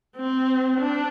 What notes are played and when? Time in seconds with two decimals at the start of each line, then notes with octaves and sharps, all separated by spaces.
0.17 C4
0.80 D4